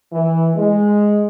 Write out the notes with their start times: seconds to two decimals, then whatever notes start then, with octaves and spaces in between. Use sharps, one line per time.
0.12 E3
0.56 G#3